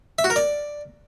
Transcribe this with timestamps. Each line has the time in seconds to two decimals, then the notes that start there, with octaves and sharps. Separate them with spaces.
0.19 E5
0.24 F#4
0.30 A#4
0.36 D5